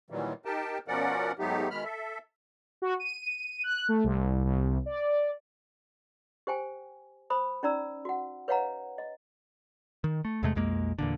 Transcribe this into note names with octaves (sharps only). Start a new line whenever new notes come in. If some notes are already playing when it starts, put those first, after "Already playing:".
A#2 D#3 E3 F#3 G3
D#4 G4 A#4 G5 A5
B2 F3 C#4 A#4 D5 F#5
G#2 F#3 A3 B3 D#4 G4
B2 D#3 G#3 B5 F6
A4 E5
F#4
D#7
F#6
A3
C2
C2
D5
G4 C5 G5 G#5
C5 B5 D#6
C#4 D#4 D5 A#5 E6
F#4 F#5
B4 C#5 D#5 F5 F#5 A#5
D#5
D#3
A3
E2 C3 G#3 A3
B1 F2 G#3 A#3
E2 A#2 D3